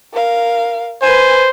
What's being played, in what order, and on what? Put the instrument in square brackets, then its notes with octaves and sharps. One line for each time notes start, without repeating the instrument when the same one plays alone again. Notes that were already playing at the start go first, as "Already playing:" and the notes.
[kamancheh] A#4 F5
[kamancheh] B4 G#5 [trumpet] C5